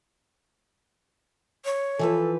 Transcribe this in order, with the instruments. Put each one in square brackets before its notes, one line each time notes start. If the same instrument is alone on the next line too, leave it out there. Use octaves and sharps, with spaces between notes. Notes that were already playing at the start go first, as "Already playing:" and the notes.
[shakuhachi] C#5
[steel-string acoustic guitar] E3 F3 B4 [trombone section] A4